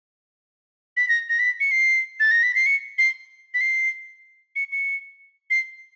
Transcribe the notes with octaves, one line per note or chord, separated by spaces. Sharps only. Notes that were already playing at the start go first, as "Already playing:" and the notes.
B6
A#6
A#6
B6
C#7
C7
A6
A#6
B6
C7
C#7
C7
B6
C7
C#7
C#7
C7